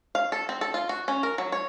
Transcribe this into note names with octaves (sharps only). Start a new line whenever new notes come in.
F5
A4
C4
A4
F4
F#4
C#4
A#4
F#3
C#5